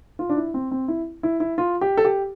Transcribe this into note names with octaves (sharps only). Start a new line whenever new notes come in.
F4
D4
E4
C4
C4
E4
E4
E4
F4
G4
A4
G4